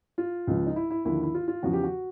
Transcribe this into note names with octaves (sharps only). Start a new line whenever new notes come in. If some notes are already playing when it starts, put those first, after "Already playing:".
F4
C#2 C#3 F3
D#4
E4
E4
D#2 D3 F3 E4
E4
F4
F4
E2 C#3 F3 F#4
G4
F#4